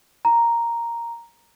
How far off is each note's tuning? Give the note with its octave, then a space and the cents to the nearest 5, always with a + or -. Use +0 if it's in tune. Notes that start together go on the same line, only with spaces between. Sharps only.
A#5 +0